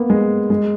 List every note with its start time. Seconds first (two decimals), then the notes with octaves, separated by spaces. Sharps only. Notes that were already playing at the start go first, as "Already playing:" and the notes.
Already playing: A#3 B3
0.10 G#3
0.50 G#3